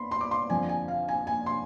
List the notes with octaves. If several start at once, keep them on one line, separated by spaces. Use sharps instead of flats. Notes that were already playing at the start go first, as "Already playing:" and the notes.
Already playing: B3 B5 C6
C6
D6
C6
F2 D3 F3 G#5
G#5
F5
G#5
G#5
C6